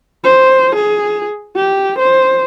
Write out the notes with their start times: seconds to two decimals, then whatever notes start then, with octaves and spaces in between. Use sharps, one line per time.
0.24 C5
0.76 G#4
1.56 G4
1.99 C5